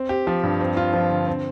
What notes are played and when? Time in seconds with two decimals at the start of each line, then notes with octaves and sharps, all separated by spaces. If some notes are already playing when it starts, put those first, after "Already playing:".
Already playing: C4
0.09 G4
0.27 F3
0.43 G2
0.61 C4
0.77 F4
0.94 F3
1.10 D3
1.27 C4